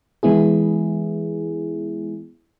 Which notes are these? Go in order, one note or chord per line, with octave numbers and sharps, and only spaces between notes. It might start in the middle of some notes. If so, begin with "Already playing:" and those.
E3 G#3 B3 E4 G#4